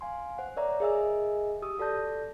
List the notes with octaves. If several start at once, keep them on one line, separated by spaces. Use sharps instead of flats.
F5 G#5 C6
C5 F#5
A#4 C#5 D5 E5 A#5
G#4 A#4 D#5 E5 G#5 E6
G4 D#6 E6
F#4 A4 D5 A5 G6 A#6